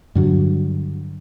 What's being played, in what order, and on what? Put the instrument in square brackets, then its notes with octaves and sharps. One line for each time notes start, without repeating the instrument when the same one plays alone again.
[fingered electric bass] G2 D3 F#3